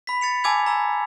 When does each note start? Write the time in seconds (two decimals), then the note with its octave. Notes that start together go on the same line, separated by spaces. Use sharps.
0.07 B5 B6
0.21 A6 C#7 F7
0.44 G#5 A5 D6 E6 G#6 F7
0.66 A#5 E6